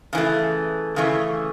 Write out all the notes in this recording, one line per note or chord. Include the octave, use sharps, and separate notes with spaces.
C#3 E3 A3
C#3 E3 A3